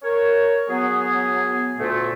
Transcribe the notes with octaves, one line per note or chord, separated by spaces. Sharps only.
A#4 C#5
F#3 B3 G#4
D2 A#2 A3